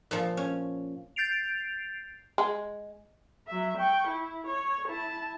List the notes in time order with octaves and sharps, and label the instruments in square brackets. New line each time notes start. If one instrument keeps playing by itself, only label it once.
[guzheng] A#2 F3
C#4
[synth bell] G6 A6 C7 D7 F7
[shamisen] G#3
[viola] F#3 E5
G5 C#6
E4
C#5
E4 A5